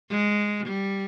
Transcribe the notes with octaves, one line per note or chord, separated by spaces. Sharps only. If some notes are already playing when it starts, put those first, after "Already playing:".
G#3
G3